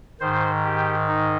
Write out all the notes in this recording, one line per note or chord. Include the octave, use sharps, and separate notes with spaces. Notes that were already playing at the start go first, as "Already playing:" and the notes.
G#2 D#3 C5
G4
D#4